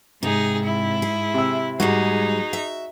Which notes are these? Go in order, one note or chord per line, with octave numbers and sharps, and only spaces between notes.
G#2 C3 D#4 G#4
E4
G#4
C3 E6
G#2 G3 G#3 D#4 F#4 G#4
E5